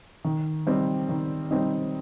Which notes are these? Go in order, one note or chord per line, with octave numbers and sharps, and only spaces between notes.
D#3
G3 C4 D#4
D#3
G3 C4 D#4